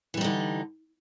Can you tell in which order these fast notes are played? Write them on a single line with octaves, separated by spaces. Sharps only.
E3 G3 D#4 D3